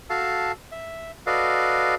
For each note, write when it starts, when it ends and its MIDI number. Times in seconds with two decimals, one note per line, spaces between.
0.10 0.52 66
0.10 0.52 69
0.10 0.52 77
0.10 0.52 81
0.72 1.11 76
1.27 1.95 66
1.27 1.95 69
1.27 1.95 71
1.27 1.95 74
1.27 1.95 75
1.27 1.95 77